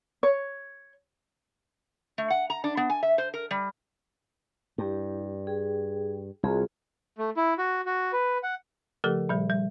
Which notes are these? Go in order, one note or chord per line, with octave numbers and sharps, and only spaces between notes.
C#5
A3
F#5
A#5
D4
B3
G#5
E5
C5
A#4
G3
G2 E4 G4
G#4 G5
C2 F4 F#4 G#4
A3
E4
F#4
F#4
B4
F#5
C#3 F3 A3 G4 A4
A#2 D#3 F3 G3
G3